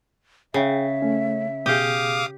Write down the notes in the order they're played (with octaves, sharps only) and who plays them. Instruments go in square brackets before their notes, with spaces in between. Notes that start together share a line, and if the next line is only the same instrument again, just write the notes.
[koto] C#3 [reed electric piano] G#4 G5 [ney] E5
[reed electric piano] A3 C#4
[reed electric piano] B2 G#4 [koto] G4 [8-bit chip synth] F5 D6 D#6